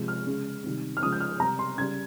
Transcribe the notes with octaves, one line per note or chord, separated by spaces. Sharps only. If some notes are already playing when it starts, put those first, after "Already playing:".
Already playing: C3 F3 G#3
F6
C#3 G#3
C3 D#3 G3
F6
C#3 F3 G#3 D#6
G6
F6
C3 G3 A#5
C6
C#3 G3 G#6